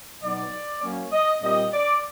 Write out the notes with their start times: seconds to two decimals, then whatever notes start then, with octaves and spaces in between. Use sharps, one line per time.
0.22 B2 F#3 B3 D#4 D5
0.82 F#3 A#3 C#4
1.12 D#5
1.42 A#2 G3 C4 D#5
1.73 D5